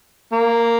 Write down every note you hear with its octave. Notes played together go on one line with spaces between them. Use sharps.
A#3